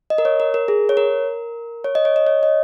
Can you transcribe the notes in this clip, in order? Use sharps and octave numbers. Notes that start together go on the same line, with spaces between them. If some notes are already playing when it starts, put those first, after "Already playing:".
D#5
A#4
C#5
A#4
A#4
G#4
C#5
A#4
C#5
D#5
C#5
D#5
C#5
D#5